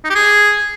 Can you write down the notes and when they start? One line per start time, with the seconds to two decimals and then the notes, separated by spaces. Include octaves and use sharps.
0.05 D#4
0.10 G4
0.15 G#4